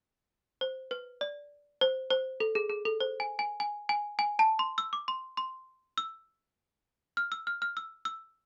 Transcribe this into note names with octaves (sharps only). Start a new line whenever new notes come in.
C5
B4
D5
C5
C5
A4
G#4
G#4
A4
C5
G#5
G#5
G#5
G#5
G#5
A5
C6
E6
D6
C6
C6
E6
F6
E6
F6
F6
E6
E6